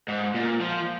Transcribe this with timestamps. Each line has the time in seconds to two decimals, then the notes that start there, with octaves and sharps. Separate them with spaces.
0.08 G#2
0.34 A#2
0.61 F3